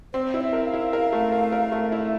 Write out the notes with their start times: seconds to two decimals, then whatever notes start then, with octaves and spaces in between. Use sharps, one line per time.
0.13 C4 C5
0.34 E4
0.40 E5
0.53 A#4
0.66 F5
0.73 E4
0.93 A#4
1.13 A3
1.32 A#4
1.52 A#4
1.72 A3 E5
1.92 E4